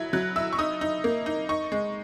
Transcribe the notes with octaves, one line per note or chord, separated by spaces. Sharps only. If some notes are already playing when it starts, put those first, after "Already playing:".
Already playing: F#3 E4 G#6
F#3 F#6
E4 E6
C#6
D#4 D#6
D#4
A#3
D#4
D#4 C#6
G#3